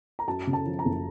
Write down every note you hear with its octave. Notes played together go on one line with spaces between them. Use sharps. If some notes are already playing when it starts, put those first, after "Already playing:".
A#5
F#2 A5
C#3
A5
F3
A#5
F#1